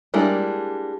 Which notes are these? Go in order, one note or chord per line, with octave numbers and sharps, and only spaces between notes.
G3 G#3 A#3 D4 E4